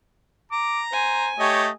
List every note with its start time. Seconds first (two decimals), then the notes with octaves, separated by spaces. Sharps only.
0.52 A#5 D6
0.93 C5 G#5
1.39 A3 G4 C#5 D#5